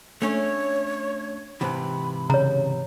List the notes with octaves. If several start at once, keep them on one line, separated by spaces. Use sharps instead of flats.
A3 C#4 D4 C#5
G#2 C3 E3 B5
C#3 C#5 A#5